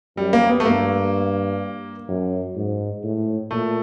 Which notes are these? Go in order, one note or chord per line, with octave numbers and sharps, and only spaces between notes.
F#2 G3
A#3
B3
A3
G2 A#3
F#2
G#2
A2
A#2 A3